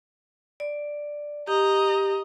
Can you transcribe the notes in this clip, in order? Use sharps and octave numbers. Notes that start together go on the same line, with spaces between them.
D5
G4 D#5 A#5